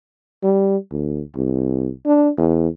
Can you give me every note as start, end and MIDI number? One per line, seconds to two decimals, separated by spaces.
0.44 0.77 55
0.91 1.21 38
1.36 1.90 36
2.06 2.29 62
2.38 2.68 40